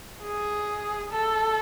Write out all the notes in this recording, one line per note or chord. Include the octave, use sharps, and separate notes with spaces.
G#4
A4